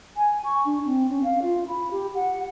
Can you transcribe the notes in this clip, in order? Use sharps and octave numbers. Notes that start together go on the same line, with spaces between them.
G#5
C#6
D4
C4
C#4
F5
F4
B5
G4
F#5